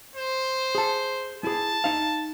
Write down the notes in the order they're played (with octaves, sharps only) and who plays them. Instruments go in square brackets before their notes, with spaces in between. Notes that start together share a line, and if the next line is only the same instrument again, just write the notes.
[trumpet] C5
[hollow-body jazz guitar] G#4 A5
[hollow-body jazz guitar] E4 G#4 [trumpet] A5
[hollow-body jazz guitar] D#4 F5